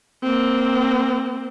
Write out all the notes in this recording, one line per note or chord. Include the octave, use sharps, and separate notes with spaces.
A#3 C4